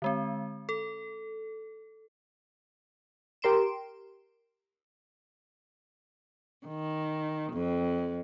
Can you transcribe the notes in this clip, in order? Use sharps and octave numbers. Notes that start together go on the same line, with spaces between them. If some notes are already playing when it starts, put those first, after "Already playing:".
D3 G#3 C4
A4
G4 A#4 C6 D7 E7
D#3
F2